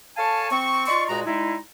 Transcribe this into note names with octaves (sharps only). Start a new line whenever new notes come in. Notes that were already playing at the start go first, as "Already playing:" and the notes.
A4 C#5 F5 G#5 A5
C4 C#6
D#4 F4 D5 C6 C#6
G2 A#2 G#3 F#4 G#4 A#5
G3 G#3 D#4 E4